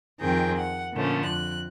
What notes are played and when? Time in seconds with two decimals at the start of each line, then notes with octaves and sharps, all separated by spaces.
0.20 F2 D#3 C4 G#4 G5
0.57 F#5
0.94 A#2 D3 F3 A3 C#4
1.25 F2 F#6